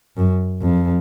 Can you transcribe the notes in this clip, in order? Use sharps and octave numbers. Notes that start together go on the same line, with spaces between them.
F#2
F2